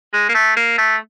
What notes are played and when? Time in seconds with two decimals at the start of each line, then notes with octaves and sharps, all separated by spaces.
0.13 G#3
0.29 A#3
0.34 A3
0.57 A#3
0.78 A3